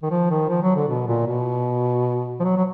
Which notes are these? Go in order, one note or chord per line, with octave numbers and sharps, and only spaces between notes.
D#3
F3
D#3
F3
F#3
D3
B2
A#2
B2
F3
F#3
F#3